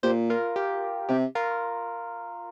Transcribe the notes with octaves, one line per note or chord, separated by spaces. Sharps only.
A#2 G4 C5
F4 A#4
G4
C3 G4
F4 A#4